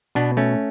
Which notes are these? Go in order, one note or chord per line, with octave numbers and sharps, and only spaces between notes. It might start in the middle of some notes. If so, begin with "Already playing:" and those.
B2 B3 D4
A3 C#4